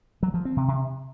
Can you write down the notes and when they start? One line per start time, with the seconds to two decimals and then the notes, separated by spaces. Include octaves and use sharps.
0.23 F#3
0.34 F3
0.45 C4
0.57 C3
0.68 C3